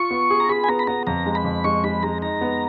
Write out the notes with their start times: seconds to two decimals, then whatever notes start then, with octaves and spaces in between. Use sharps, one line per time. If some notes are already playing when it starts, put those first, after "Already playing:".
Already playing: F4 C#6
0.11 B3
0.30 G#4
0.40 A#5
0.49 G#4 B5
0.64 G#5
0.68 B3 A#5
0.79 B5
0.87 B3 A#5
1.07 F2 A#5
1.26 G#3
1.35 B5
1.45 F2
1.64 G#3 C#6
1.84 G#3 B5
2.03 G#3 A#5
2.22 D#4 A#5
2.41 B3